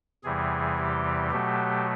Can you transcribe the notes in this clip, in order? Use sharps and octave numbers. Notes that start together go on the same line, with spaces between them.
E2 C3 E3 G3 G#4
G4
B2 F#3 A3 G4